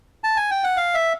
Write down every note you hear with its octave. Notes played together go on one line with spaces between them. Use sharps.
A5
G#5
G5
F#5
F5
E5